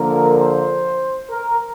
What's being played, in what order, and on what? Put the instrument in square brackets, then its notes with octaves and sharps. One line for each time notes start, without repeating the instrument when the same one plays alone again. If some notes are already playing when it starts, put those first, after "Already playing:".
Already playing: [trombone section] D3 F3 A#3 A#4
C5
A#4